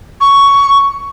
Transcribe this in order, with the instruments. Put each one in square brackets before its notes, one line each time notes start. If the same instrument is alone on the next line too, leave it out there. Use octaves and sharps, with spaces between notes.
[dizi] C#6